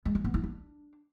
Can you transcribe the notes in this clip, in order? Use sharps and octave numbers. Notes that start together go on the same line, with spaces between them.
G#3
F4
B3
E4
D4